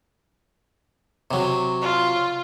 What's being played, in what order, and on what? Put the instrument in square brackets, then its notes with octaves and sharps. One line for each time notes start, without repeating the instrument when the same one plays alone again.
[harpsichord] C3 F#3
[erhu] F4